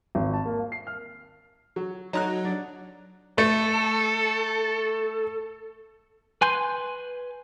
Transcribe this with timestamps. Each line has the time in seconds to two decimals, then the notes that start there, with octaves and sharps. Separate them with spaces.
0.15 G#1
0.33 A5
0.45 A#3
0.58 F5
0.72 C7
0.87 F6
1.76 F#3
2.13 F#3 D#4 A#5 F#6
2.45 D4
3.38 A3 A4
6.41 B4 G#5 C6 G6